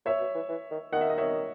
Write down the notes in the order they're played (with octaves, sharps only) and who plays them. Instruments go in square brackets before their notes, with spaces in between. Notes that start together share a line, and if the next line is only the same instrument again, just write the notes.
[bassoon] A#2 [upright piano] C#5 E5
[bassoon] B2
E3
E3
D#3
[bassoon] D#3 [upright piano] F#5
[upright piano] E5
D#5
C#5 E5